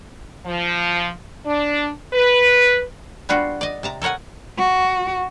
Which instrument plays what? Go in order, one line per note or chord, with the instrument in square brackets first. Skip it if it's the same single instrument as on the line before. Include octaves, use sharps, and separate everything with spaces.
[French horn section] F3
D4
B4
[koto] G3 B3 D4 F4 F#4
D5 D#5
C3 A5 A#5
A4 A#4 C#5 F#5 G#5
[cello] F#4